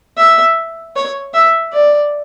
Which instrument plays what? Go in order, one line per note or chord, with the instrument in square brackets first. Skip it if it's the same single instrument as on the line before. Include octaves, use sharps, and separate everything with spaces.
[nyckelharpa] E5
C#5
E5
D5